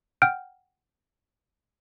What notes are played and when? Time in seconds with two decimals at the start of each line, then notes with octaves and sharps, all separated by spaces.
0.22 F#5 G5 F6 G6 D7